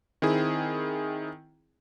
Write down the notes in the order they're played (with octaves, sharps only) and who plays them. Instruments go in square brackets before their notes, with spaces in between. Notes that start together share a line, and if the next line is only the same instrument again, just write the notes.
[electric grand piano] D#3 C4 E4 G#4